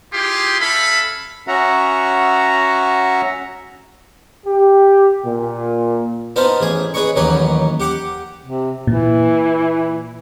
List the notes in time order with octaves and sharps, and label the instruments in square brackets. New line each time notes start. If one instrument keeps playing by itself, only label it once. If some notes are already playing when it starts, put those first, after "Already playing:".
[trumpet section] E4 F4 G4 G#4 C6
C#4 A4 E5 F5 B5
[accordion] C#4 F#4 E5 F#5 A#5
[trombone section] G4
A#2
[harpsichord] B3 D#4 C5 F5 A5 B5
A1 G#4 G#5
G#4 B4 C#5 D#5 C#6
A1 D#2 F#3 D#4 B4 C#5
G4 F#5 D6
[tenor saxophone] C3
[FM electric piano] A#2 [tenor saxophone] E3